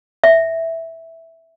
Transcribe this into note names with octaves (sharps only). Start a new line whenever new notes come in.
E5